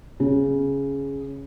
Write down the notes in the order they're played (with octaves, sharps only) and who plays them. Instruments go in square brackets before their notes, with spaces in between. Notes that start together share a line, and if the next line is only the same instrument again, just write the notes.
[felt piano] C#3